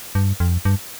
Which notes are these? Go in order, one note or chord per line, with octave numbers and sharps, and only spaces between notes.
G2
F2
G2